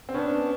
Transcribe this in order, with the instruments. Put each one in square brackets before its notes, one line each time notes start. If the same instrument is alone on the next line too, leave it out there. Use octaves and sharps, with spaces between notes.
[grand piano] C4
[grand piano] B3 C#4 [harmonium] D4